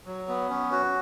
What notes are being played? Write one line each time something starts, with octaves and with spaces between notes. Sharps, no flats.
F#3
B3
C#4
F#4